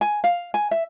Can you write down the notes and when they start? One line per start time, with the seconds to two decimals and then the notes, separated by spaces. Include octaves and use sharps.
0.01 G#5
0.24 F5
0.54 G#5
0.71 E5